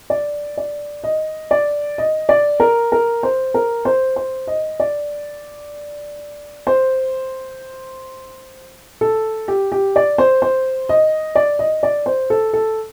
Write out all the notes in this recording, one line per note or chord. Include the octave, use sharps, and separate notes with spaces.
D5
D5
D#5
D5
D#5
D5
A#4
A#4
C5
A#4
C5
C5
D#5
D5
C5
A4
G4
G4
D5
C5
C5
D#5
D5
D#5
D5
C5
A4
A4